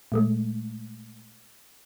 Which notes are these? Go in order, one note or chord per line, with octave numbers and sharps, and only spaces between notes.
A#2 G#3 A3